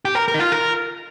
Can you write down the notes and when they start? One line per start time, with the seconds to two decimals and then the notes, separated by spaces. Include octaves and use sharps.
0.05 G4
0.15 A#4
0.28 A#4
0.34 D#4
0.40 F4
0.52 A#4